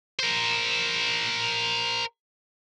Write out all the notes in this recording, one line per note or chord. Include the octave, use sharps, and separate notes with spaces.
A#4 C5